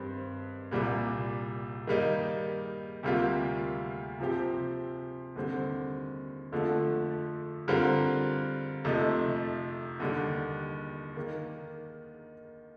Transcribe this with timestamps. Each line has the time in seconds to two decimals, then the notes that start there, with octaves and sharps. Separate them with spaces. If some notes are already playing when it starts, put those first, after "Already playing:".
Already playing: G2 D#3 G3 C4
0.71 C2 A#2 G3 A#3
1.87 D#3 G3 A#3 D#4
3.03 D2 C3 G3 A#3 F4
4.20 C3 F3 C4 G4
5.36 D#2 D3 G3 C4
6.52 F2 D3 F3 A3
7.68 D3 G3 C4 F4 A#4
8.84 F2 C3 F3 A3 D#4
10.00 D#2 D3 G3 D4
11.16 D#3 A#3